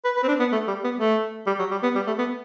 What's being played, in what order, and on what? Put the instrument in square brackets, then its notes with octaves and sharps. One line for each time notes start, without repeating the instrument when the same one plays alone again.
[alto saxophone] B4
B4
C4
D4
B3
A3
G3
B3
A3
G3
F#3
G3
B3
G3
A3
B3